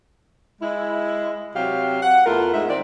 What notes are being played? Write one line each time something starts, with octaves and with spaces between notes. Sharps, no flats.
G#3 E4
C3 F#3 G4 F5
F#5
E2 A3 F4 A#4
G#2 E5
D#3 C4 D5 E5